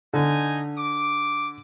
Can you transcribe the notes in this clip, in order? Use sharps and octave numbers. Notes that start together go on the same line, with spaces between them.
D3 D#4 G#5
D6